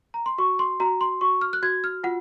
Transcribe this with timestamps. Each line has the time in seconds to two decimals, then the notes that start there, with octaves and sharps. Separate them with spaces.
0.14 A#5
0.26 C6
0.38 F#4 C#6
0.59 C6
0.80 F#4 A#5
1.01 C6
1.21 F#4 C#6
1.41 F6
1.53 F#6
1.63 F#4 G#6
1.84 F6
2.04 F4 F#5